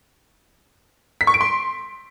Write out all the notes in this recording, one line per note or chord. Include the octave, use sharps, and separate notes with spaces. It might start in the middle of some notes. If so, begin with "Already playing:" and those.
B6
C#6
D7
C6